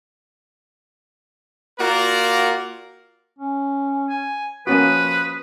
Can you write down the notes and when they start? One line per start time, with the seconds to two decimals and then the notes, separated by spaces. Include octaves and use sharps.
1.79 A#3 F4 F#4 A#4 D5
3.38 C#4
4.10 G#5
4.67 F3 A#3 C#4 F#4 B4 D#6